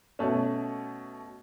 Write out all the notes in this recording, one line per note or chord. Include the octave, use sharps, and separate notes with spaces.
B2 A3 C#4